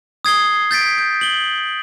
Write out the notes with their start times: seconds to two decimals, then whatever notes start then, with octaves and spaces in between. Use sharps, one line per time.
0.25 D#6 G#6 C7 G7
0.71 G6 A6 B6 D7
0.98 G6
1.21 F#7 G7